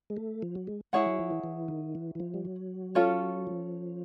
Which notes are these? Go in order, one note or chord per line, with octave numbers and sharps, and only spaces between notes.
G#3
A3
F3
F#3
G#3
G#3 E4 G#4 C#5 F#5
F#3
F3
E3
E3
D#3
E3
E3
F3
G3
F#3
C#4 F4 A4 C#5
F3